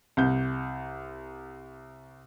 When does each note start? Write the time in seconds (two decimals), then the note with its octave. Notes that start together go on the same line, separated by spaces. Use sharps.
0.17 C2 G6